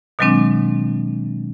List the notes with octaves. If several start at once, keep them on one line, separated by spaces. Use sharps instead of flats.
B2 D#3 F#3 G#3 C4 D4